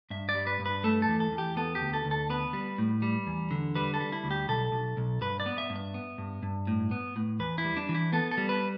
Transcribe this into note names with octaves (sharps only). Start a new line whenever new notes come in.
G2 E5
D5
G3
B4
G2
B4
A3 A4
A4
E2
A4
E2
G4
B3 A4
G4
D2
A4
D2
A4
B3 B4
G3
A2
G3
E2
D3
G3 B4
A4
G3
E4
D2
G4
B1 A4
B1
B1
G2 B4
D5
B3
E5
G2
E5
B3
G2
G2
A2
B3
A2
E2 B4
E4
G3
D4
E3
E4
B3 A4
A4
G3
B4